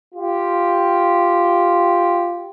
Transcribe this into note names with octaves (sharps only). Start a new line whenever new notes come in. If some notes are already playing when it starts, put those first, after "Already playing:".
F4 G4